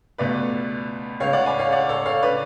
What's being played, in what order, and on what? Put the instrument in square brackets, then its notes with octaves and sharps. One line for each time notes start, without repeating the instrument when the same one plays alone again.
[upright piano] C#2 B2 A3 B4 D5
C#2 C#3 G#3 C#5 F5
D5 F#5
G#5 B5
C#5 F5
D5 F#5
A4 C#5
C#5 F5
D3 B4 D5